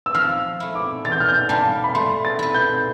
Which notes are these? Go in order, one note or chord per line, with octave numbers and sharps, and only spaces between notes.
E6
F3 F6
A3 E4
D6
E3 A6
G6
F6
G6
G3 D4 F4 A5
B5
A3 C6
A6
E4 B4
G6